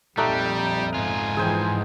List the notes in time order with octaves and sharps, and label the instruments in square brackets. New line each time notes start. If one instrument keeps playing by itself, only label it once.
[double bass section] A#1 F2 [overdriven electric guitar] G3 [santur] A3 D#4 F#5 [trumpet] G4
[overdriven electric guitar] G#2 F4 [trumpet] G#5
[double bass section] E3 F3 [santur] G#4 C5 G5